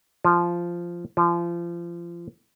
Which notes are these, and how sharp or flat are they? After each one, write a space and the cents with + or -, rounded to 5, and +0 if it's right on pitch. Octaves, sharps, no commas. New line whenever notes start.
F3 -10
F3 -30